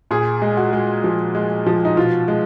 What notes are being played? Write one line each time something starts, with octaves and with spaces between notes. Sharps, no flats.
A#2 G#4
G#3
F#4
G#3
F3
G#3
F3
D#4
B2 F4
G#3